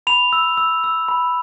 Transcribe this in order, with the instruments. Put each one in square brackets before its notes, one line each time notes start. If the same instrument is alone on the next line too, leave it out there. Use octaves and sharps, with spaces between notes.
[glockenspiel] B5 F7
E6
E6
E6
B5